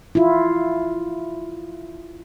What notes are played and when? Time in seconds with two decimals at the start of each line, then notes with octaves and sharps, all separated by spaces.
0.15 E4 F4